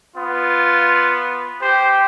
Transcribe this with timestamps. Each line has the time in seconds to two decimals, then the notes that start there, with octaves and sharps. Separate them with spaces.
0.16 B3 F4
1.61 G4 C5